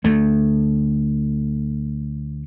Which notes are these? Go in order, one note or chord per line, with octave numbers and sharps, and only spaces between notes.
D2 A3